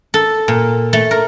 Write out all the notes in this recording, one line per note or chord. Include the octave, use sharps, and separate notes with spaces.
A4
A#2
A3
A#4